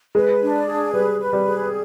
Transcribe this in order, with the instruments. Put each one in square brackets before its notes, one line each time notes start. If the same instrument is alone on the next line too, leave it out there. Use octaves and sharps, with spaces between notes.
[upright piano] G#3 [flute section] B4
[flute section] D4
G#4
[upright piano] G3 [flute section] B4
[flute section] B4
[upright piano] G3
[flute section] G#4